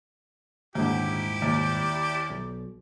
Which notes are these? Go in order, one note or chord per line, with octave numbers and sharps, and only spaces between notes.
D#1 D#2 G#2 D3 E4 G4
D#2 D5
B1